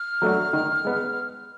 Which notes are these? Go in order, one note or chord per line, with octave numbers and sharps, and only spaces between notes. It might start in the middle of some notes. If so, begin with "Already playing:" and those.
Already playing: F6
F#3 A3 D4 F#4
D#3
G#3 B3